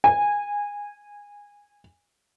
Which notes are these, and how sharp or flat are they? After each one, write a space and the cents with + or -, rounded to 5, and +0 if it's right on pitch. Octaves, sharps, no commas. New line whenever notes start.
G#5 -15